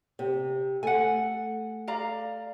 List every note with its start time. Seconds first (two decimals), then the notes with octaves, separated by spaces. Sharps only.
0.19 C3
0.83 A3 F#5 G#5
1.88 D5 F5 A#5